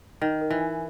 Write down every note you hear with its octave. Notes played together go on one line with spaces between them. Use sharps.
D#3 A#4
A#4
E3
G#5